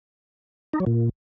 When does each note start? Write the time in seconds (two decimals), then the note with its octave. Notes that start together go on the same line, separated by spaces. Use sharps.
0.73 D#4
0.80 F#3
0.86 A#2